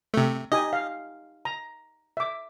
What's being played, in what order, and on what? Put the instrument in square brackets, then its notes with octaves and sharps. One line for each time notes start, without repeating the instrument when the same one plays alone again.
[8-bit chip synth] C3 A3
[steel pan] D#4 G4 G#5 [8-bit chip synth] D#5
[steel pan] F5
A#5
E5 D6